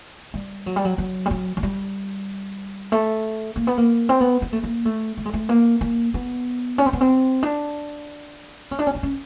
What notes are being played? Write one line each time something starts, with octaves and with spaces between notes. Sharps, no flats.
G3
F#3
G3
F#3
F#3
G3
F#3
F#3
G3
A3
A#3
B3
A#3
C4
B3
B3
A3
A#3
A3
A3
G#3
A3
A#3
A#3
B3
C#4
C4
B3
C4
D4
C#4
D4
C#4
D4
C#4